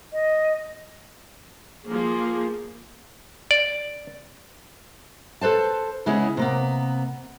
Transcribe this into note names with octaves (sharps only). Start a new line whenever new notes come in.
D#5
F3 A#3 G#4
D5
A4 B4 C5 A5
C#3 G#3 B3 C#4 E4 G#4
C3 A#3 B3